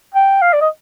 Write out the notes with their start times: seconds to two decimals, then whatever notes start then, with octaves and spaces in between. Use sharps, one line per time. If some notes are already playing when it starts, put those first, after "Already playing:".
0.15 G5
0.42 F5
0.53 D5
0.61 D#5